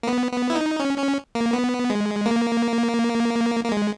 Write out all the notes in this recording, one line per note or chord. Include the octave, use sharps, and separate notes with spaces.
A#3
B3
B3
E4
D#4
C#4
C#4
A#3
B3
G#3
A#3
A#3
G#3